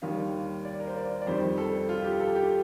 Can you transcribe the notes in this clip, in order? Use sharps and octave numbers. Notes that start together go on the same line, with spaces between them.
D#2 D#3 G3 F5
D5
A#4
C5
D5
D5
F2 D#3 G3 C5
A4
F4
G4
A4
G4